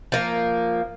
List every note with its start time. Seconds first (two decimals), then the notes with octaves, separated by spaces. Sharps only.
0.12 F3 A#3